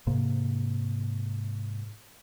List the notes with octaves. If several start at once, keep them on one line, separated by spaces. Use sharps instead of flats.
G#2 C3 A#3